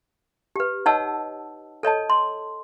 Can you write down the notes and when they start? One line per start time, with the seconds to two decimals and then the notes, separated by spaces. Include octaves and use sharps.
0.56 G4 B4
0.86 D#4 C#5 D#5 F#5 A5 E6
1.83 A4 C#5 D#5 A5
2.10 C6